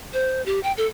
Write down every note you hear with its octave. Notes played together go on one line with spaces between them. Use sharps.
C5
G4
G5
A4